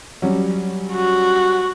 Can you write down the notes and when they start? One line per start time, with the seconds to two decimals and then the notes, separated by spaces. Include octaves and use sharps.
0.22 F#3 G3 C#4
0.92 F#4